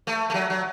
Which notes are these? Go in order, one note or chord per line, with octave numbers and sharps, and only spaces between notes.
A3
A3
F#3
F#3